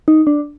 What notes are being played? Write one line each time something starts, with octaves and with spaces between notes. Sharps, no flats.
D#4
D4